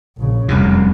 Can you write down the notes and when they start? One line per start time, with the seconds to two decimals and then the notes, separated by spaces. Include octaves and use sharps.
0.18 A#1 C#3
0.48 F1 C2 F#2 C3